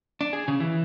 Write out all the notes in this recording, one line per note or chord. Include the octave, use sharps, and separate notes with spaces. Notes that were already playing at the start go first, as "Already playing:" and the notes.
D4
G#4
C#3
E3